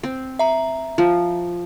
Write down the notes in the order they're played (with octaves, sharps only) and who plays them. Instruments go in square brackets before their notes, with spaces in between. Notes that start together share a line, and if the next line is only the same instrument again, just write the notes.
[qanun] C4
[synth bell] E5 A#5
[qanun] F3